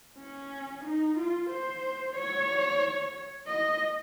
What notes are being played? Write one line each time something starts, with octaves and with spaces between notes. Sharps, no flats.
C#4
D#4
F4
C5
C#5
D#5